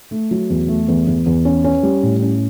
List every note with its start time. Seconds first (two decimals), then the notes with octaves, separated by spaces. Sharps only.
0.11 A3
0.31 F#3
0.50 E2
0.68 A3
0.88 E2
1.07 E2
1.26 E2
1.45 C#4
1.64 C#4
1.83 G3
2.03 A2
2.22 C#4